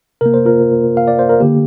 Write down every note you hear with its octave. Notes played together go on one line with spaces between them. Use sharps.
C3 A#3 A#4
C5
F4 A#4
F5
D5
C5
A#4
D3 A#3 G4